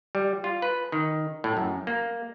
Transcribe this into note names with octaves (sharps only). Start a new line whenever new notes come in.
G3
F4
B4
D#3
A2
F#2
A#3